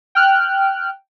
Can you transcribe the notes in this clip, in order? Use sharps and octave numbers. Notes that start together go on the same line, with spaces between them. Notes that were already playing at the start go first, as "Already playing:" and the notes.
G5 F6 F#6